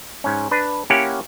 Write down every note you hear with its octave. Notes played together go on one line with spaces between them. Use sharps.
G#2 C#4
D4 B4
A#3 C#4 E4 G4 C#5 F#5